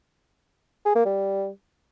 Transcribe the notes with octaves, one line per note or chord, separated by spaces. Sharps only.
G#4
A#3
G3